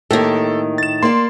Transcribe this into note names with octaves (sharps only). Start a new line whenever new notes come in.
A2 D#3 A#3 G4 A4
A6 E7
A#3 D5 C6